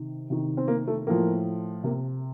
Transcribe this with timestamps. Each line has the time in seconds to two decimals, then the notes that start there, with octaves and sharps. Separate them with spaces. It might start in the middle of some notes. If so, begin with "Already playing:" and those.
Already playing: C3 D#3
0.30 C3 D#3
0.57 C4
0.68 A#3
0.88 A3
1.07 A2 F3 A#3
1.84 C3 A#3